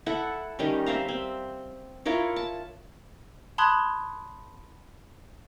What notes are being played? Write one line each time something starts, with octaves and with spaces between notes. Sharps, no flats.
E4 A4 F#5
D#3 G3 C#4
C4 E5 F5 A#5
C4
E4 F4 A#4 C#5
A5
A5 B5 C6 D#6 F#6 G#6